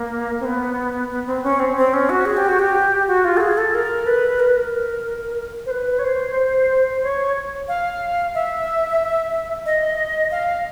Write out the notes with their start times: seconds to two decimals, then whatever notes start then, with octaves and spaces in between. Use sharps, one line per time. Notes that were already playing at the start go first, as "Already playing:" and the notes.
Already playing: A#3
0.40 C4
0.46 B3
1.11 B3
1.27 C4
1.43 C#4
1.59 C4
1.77 C4
1.93 C#4
2.09 F#4
2.25 G#4
2.37 G4
2.49 F#4
2.59 G4
3.08 F#4
3.25 F4
3.37 A4
3.40 G#4
3.58 A4
3.74 A#4
4.07 B4
4.40 A#4
4.48 B4
4.56 A#4
5.66 C5
5.71 B4
5.99 C#5
6.04 C5
7.03 C#5
7.68 F5
8.35 E5
9.66 D#5
10.31 F5